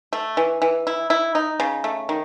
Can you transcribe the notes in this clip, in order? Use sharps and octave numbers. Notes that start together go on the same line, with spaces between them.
A3
E3
E3
E4
E4
D#4
C#3
A3
D#3